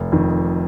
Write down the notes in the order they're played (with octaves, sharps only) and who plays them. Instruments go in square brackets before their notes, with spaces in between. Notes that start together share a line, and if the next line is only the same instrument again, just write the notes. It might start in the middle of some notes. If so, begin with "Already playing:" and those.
Already playing: [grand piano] F1
F2 D#3